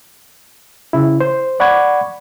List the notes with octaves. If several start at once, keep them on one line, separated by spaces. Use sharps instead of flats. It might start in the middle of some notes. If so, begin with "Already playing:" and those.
C#3 E4
C5
D5 F#5 B5 C#6 G#6